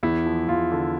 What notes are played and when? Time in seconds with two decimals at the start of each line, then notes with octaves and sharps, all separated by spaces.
0.03 E2 E4
0.26 F3
0.48 E2 F4
0.72 D3